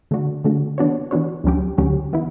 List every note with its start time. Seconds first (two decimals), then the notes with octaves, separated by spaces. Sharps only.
0.11 D3 A3 D4 F#4
0.44 D3 A3 D4 F#4
0.78 E3 B3 D4 F#4 C#5
1.11 E3 B3 D4 F#4 C#5
1.44 D2 D3 F#3 C#4 G4
1.78 D2 D3 F#3 C#4 G4
2.13 E3 B3 E4